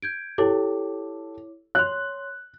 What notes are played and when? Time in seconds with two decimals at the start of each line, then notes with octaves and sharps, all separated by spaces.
0.02 G6 G#6 D7
0.38 E4 G4 A4 C#5 D6
1.75 C#5 C6 F#6